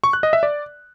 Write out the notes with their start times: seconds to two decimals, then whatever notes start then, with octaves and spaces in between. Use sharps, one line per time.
0.04 C#6
0.13 F#6
0.23 D#5
0.33 E5
0.43 D5